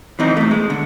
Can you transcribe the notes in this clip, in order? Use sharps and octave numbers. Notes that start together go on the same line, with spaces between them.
E3 C4 D#4
B2 A3
G#3
D3